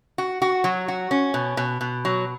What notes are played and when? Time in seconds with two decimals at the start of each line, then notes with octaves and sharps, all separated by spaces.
0.18 F#4
0.42 F#4
0.64 F#3
0.88 F#4
1.11 C#4
1.34 B2
1.57 B2
1.81 B2
2.05 F#3